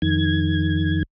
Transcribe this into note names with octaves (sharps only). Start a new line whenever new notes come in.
F2 D#3 G#6